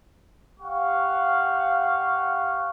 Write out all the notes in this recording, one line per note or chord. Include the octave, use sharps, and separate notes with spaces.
G4 F5 F#5 C#6